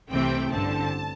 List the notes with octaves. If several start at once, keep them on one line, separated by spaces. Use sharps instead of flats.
C2 C3 E3 A3 C4 G5
A1 G2 D3 C4 A5